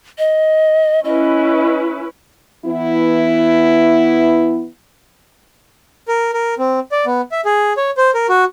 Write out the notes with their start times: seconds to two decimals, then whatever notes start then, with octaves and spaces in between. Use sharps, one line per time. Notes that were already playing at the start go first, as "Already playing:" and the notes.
0.18 D#5
1.05 C#4 E4 B4 D#5
2.65 E3 B3 E4
6.08 A#4
6.34 A#4
6.58 C4
6.92 D5
7.06 B3
7.32 E5
7.45 G#4
7.77 C#5
7.97 C5
8.14 A#4
8.29 F#4